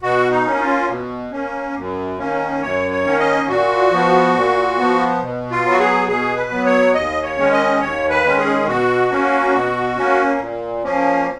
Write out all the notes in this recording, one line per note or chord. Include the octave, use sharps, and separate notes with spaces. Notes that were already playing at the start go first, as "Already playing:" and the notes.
B2 F#4
D#4
A#3 C#4
D#4
F4
B2
A#3 C#4
F#2
D#3 A#3 C#4
F#2 C#5
C#5
D#3 A#3 C#4
D#5
A#2 F#4
F3 B3
A#2
F3 B3
B2
F4
F#3 B3
F#4
G#4
B2 G#4
B4
F#3 B3
C#5
D#2 D#5
C#5
D#3 G#3 C#4
D#5
D#2 C#5
B4
D#3 G#3 C#4
G#4
B2 F#4
A#3 C#4
B2
A#3 C#4
A#2
F3 A#3 C#4